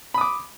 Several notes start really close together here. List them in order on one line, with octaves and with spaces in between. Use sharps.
B5 D#6 D6